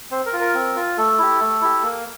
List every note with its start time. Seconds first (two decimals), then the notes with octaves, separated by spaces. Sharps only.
0.11 C4 C5
0.26 A#4
0.33 F4
0.40 A#4
0.54 C4
0.76 F4
0.97 A3 A4
1.18 E4 G4
1.41 A3
1.61 E4 G4
1.83 A#3